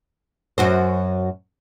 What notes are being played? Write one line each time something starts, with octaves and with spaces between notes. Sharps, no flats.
F#2 F#4 C5